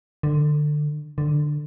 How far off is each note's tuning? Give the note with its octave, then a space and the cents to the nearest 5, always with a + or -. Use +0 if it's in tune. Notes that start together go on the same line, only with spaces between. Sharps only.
D3 +25
D3 +15